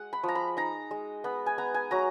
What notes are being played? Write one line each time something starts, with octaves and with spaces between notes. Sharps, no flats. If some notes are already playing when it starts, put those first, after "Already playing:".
Already playing: G#3 F#5
B5
F3
A#5
B5
D#4 A#5
G#3
B3 B5
G#5
B3 A#5
G#5
F#3 A#5